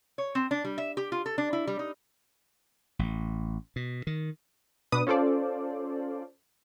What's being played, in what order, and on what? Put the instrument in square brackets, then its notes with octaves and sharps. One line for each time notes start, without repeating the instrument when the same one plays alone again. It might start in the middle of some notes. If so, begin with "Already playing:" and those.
[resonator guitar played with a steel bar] C#5
C4
D4
G3
E5
G4
F4
A4
D4
E4
G3
D#4
[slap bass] A1
B2
D#3
[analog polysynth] B2 D4 B4 D#6
C#4 F4 A4 C5 D5